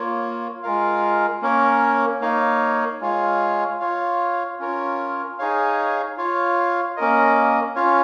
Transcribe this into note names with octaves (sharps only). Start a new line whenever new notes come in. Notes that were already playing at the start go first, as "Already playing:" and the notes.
Already playing: A#3 F4 C#5
G#3 F4 A#4 F5
A#3 C#4 A#4 C#5
A#3 D#4 C#5 F5
G#3 F4 C#5 F5
F4 C#5 F5
C#4 F4 A#4 C#5
D#4 G#4 C#5 F5
F4 C#5 F5
A#3 C#4 A#4 D#5
C#4 F4 C#5 F5